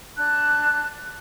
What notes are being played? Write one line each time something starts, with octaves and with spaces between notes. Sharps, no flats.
D4 A5 F#6